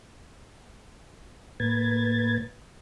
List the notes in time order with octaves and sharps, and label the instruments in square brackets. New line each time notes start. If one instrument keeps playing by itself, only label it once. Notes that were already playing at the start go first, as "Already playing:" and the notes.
[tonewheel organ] A2 A#3 B4 G#6 A6